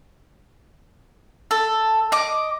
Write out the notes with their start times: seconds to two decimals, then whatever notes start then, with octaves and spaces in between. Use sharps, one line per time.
1.51 A4
2.12 D#5 D6